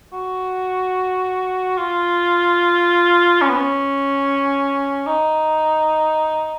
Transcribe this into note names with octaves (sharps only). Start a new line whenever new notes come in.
F#4
F4
C#4
B3
C#4
D#4